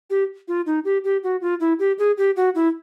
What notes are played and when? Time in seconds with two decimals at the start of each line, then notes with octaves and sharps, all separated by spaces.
0.10 G4
0.48 F4
0.66 D#4
0.85 G4
1.04 G4
1.23 F#4
1.42 F4
1.60 E4
1.79 G4
1.99 G#4
2.18 G4
2.36 F#4
2.55 E4